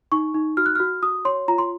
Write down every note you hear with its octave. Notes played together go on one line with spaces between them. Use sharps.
D#4 C#6
D#4
F#4 F6
F#6
F#4 F6
F#4 D#6
C#5 C6
F4 A#5
C6